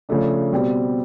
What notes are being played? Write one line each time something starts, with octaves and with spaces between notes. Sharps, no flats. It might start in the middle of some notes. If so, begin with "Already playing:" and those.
C#3 F3 A3 D4
B2 G3 C4